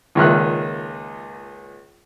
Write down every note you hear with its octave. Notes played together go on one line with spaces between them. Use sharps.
C#2 A#2 D#3 E5 F6 F#6